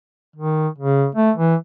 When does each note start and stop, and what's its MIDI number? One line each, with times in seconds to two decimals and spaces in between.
0.36 0.68 51
0.78 1.07 49
1.15 1.31 57
1.37 1.55 52